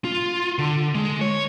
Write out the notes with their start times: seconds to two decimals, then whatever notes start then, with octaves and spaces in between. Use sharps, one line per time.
0.05 F4
0.58 D3
0.95 G#3
1.21 C#5